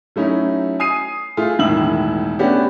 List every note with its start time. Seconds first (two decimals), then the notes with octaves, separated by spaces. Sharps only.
0.16 F#3 A3 C#4 D#4 E4
0.79 G#5 D#6 C7 D#7
1.37 A3 F4 G#4
1.59 E1 A2 D#3 E4 E6 F#7
2.39 A3 B3 C#4 D4 F#4 G4